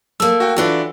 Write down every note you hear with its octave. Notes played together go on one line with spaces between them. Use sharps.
A3 A#3 E6
F#4 G5
E3 D4 F4 F#4 A4 B4